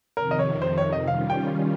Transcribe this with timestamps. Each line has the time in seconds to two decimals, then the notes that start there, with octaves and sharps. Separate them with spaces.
0.17 F2 C3 D#3 A#4
0.31 D#5
0.39 C#5
0.62 C5
0.78 C#5
0.93 D#5
1.07 D#3 G3 C#4 F4 F5
1.30 G5